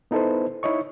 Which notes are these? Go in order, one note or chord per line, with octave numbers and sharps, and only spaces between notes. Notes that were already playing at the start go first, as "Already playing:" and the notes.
B3 D#4 E4 A4 B4 C5
D#4 E4 C#5 D#5 C#6